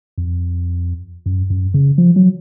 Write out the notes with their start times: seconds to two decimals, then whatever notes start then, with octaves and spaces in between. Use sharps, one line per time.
0.18 F2
1.26 F#2
1.50 F#2
1.74 C#3
1.98 F3
2.16 F#3